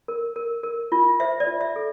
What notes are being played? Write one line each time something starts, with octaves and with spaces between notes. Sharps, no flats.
A#4
A#4
A#4
F4
C5 E5
D5
F4
E5
A4